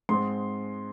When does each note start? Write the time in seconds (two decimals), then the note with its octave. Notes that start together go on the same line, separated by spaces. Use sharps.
0.09 G#2 G#3 C4 C6